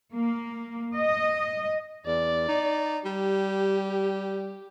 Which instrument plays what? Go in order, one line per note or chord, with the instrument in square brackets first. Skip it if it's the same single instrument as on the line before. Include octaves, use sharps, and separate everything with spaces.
[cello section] A#3
D#5
[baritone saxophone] E2 [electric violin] D5
[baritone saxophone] D#4
[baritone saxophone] G3 [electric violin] G4